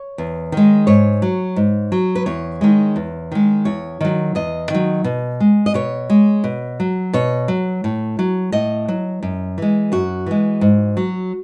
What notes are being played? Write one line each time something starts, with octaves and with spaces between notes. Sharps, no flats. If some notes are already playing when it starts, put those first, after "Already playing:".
Already playing: C#5
E2
D#3 G#3
G#2 C#5
F#3
G#2
F#3
B4
E2 C#5
D#3 G#3
E2
D#3 G#3
E2 C#5
D#3 F#3
E2 D#5
D#3 F#3
B2
G#3
D#5
B2 C#5
G#3
B2
F#3
B2 C#5
F#3
A2
F#3
A2 D#5
F#3
F#2
E3 G#3
F#2 F#4
E3 G#3
G#2
F#3